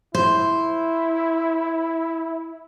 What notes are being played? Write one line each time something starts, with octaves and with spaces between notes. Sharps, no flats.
E4 C5